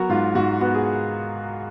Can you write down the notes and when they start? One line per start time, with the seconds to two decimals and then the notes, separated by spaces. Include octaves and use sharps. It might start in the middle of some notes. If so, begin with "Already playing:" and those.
Already playing: F#3 B3 F#4 A#4
0.09 G#2 F4
0.35 G#2 F#4
0.61 B3 F#4
0.74 G#4